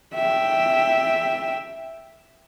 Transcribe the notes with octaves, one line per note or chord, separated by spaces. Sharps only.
E5 G5